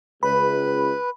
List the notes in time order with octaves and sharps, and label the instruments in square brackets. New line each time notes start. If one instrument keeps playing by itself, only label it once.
[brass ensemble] C#2 [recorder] B4 [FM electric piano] B5